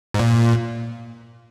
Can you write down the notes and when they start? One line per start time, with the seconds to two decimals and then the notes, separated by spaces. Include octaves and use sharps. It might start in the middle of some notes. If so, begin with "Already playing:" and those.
0.14 G#2
0.19 A#2